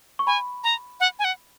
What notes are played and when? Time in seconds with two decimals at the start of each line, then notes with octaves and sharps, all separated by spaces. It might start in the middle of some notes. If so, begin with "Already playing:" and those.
0.19 C#6
0.27 G#5 B5
0.64 A#5
1.00 F#5
1.19 G#5
1.24 F#5